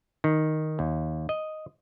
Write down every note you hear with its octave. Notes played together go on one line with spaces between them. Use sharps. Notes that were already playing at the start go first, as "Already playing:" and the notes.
D#3
D#2
D#5